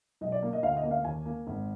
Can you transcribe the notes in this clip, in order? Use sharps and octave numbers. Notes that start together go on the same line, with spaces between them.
B1 D#5
D5
A#3
D#5
D2 F5
D#5
A#3
F5
D#2 G#5
A#3
G#1